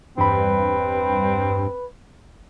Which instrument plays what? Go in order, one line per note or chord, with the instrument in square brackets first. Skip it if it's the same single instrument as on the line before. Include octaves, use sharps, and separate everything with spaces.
[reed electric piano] E2 B5 [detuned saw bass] G2 [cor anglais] C4 [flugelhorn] B4